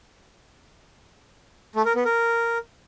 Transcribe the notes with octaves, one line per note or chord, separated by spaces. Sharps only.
A3
A#4
B3
A#4